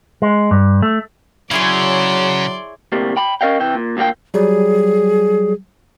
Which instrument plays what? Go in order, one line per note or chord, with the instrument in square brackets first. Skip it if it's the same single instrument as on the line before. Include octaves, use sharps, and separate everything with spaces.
[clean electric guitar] G#3
G2
A3
[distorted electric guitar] C#3 [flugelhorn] F#3 [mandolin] E4 G#4 C#5 [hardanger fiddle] D5 C6
[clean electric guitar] D2 A2 C3 G3 A#3
G5 B5
C#4 A#4 D#5 F5 G5
C3 E3 G5
A#2
D2 A#2 A#3 G4 G5
[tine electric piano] F#3 G3 [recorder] G#4